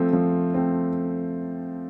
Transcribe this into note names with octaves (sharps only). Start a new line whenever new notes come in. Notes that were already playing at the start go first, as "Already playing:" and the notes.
Already playing: F3 A3 C4
F3
A3 C4